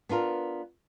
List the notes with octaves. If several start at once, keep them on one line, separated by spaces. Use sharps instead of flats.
B3 D4 F4 A#4